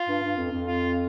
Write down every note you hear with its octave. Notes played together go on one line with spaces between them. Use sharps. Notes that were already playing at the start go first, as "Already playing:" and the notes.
Already playing: F4
G2
G2
F2
F2
F4